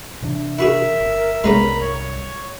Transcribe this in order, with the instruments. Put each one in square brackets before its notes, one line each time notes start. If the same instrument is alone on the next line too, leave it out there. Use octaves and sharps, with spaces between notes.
[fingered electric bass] C3 E3 D4
[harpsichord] E4 F#4 G#4 [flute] A#4 [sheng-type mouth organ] E5
[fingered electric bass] G1
[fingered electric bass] C2 G2 [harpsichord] G#3 B3 C#4 [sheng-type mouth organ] A#5 B5
[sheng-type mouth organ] C#5